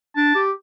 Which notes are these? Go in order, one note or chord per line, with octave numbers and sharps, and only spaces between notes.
D4 A5
G4